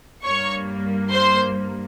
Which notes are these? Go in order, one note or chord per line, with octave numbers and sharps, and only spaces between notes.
G2 G3 A#3 C#5 C#6
C5 C6